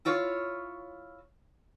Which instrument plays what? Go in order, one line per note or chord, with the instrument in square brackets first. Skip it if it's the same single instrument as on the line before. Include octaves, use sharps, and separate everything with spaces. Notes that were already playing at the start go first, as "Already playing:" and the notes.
[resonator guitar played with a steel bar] E4 F4 C#5 F5